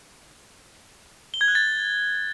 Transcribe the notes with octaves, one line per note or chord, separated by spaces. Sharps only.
G7
G#6
F#6
A6